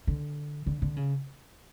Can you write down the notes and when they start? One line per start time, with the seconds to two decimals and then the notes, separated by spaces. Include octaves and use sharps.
0.07 D3
0.66 D3
0.82 D3
0.96 C#3